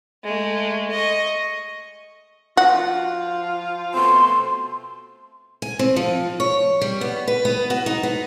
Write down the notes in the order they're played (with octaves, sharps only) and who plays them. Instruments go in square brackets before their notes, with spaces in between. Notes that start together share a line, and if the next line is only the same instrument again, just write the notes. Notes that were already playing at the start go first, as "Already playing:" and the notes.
[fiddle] G#3 A3
D#5 C#6
[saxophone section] F3 F4 [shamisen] F#4
[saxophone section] B2 A3 C4 [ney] C6
[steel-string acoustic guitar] G#5
C4
F3
C#5
G3
B3
B4
B3
F#4
D#4
B3